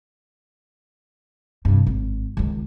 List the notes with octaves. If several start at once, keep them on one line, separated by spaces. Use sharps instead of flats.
G2 C3
G#1
C#2 D#3